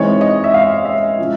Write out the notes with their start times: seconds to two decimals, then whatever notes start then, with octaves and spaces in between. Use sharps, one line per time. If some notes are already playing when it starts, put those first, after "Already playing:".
Already playing: E3 G#3 C4 D#4 C#5
0.21 D#5
0.44 E5
0.54 F5
0.85 E5
1.18 F3 G#3 C#4 E4